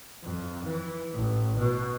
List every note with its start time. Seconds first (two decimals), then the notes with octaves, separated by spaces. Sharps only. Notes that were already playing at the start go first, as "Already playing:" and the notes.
0.23 F2
0.65 E3
1.14 A1
1.59 B2